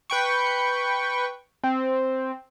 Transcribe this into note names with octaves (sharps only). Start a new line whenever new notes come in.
B4 G5 C#6
C4